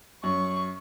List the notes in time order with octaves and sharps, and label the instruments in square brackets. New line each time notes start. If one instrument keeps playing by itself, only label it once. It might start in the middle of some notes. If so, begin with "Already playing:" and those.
[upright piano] F#2 [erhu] C#6